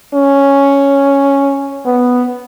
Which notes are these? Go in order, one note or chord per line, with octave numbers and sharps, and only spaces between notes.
C#4
B3